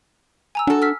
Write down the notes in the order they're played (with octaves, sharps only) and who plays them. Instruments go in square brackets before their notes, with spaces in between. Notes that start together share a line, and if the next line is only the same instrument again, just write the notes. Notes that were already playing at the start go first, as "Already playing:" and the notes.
[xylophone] G#5 A#5 E6
[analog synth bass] D4 [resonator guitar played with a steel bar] F#4 A4
[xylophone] E6 F6 B6